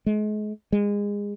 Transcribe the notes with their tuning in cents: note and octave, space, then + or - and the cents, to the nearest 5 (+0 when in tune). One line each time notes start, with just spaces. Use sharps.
G#3 +35
G#3 -25